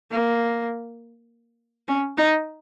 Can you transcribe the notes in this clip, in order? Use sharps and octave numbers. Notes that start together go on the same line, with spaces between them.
A#3
C#4
D#4